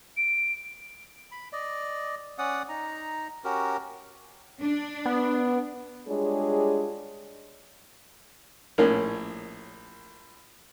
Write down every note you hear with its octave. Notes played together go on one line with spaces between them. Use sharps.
D7
B5
D5 D#5
C#4 D5 F#5 D#6
D#4 A#5
C#4 F#4 G4 A#4
D4
B3
G3 G#3 D4 F4 G#4 C#5
A#1 A2 C#4 A#4 D5